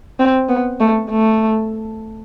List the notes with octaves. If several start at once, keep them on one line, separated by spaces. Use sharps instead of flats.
C4
B3
A3
A3